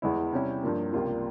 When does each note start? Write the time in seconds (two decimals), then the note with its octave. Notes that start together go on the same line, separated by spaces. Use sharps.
0.02 E2 E3 G#3 E4
0.32 C3 G3 C#4 E4
0.63 G2 F3 A#3
0.93 C#2 C3 G3 A#3 F4